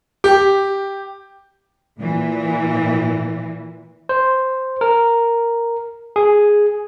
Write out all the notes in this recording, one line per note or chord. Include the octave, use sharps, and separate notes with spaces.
G4
A#2 E3
C5
A#4
G#4